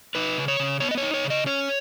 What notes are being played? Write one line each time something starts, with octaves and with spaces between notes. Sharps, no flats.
D#4 B4
C#3
C#5
C#3
B3 C#5
D#5
C#5
D#4
C#5
C#3
D#5
C#4 C#5